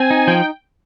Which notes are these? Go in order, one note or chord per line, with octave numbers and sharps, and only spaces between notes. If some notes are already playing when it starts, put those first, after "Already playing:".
Already playing: C4 G#5
D#4
F3 G5